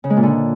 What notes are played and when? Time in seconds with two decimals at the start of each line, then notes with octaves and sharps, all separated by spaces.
0.04 C#3
0.10 G#3
0.17 A#2
0.23 D3